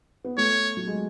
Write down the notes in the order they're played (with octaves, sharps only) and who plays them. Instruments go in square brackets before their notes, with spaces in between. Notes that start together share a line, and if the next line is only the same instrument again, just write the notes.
[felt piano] B3
[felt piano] A3 [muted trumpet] C#5
[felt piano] F#3
G#3